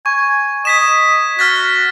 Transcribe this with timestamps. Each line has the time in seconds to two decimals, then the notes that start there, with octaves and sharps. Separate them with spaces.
0.06 G#5 C#6
0.65 D#5 G#6 B6 E7
1.39 F#4 F6 A6 B6